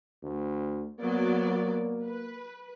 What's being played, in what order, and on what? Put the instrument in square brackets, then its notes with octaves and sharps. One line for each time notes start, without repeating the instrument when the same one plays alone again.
[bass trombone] D2
[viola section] F#3 B3 D5 [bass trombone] A#3
[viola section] B4